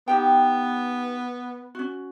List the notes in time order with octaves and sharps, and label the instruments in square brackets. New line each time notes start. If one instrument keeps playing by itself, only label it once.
[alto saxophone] B3 [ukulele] D#4 G4 G5
[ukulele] C#4 F#4